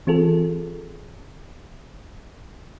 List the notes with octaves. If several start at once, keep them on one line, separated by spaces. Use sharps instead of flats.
E3 C4 F4 G#4 A4